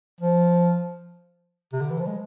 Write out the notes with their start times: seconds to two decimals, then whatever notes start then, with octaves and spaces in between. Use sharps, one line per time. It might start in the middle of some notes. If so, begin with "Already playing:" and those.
0.21 F3
1.73 C3
1.81 D3
1.90 E3
1.99 F3
2.07 G#3